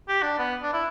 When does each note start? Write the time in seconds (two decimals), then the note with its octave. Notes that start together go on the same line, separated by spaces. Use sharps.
0.08 G4
0.22 D4
0.39 B3
0.63 D4
0.73 E4